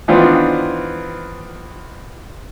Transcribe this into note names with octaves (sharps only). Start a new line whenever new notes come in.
D#3 E3 B3 C4 D4 F4